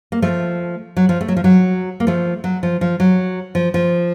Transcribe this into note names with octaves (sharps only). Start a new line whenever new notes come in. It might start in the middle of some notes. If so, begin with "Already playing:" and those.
A#3
F3 A3
F#3
F3
A3
F#3
F3
F#3
A#3
F3 A3
F#3
F3
F3
F#3
F3
F3